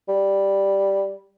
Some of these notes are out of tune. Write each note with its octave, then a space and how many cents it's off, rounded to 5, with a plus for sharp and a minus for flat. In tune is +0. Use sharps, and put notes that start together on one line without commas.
G3 +0